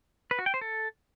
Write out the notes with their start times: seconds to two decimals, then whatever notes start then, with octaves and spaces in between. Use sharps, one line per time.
0.31 B4
0.39 F#4
0.46 G5
0.54 C5
0.61 A4